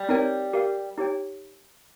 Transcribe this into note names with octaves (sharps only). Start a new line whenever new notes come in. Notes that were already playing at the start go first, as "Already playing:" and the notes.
Already playing: G3
C4 D#4 A#4 C#5 G5
G4 A#4 F5
D#4 G4 C#5 G5